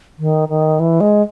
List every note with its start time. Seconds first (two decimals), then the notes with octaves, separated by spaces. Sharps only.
0.19 D#3
0.49 D#3
0.80 E3
1.01 G#3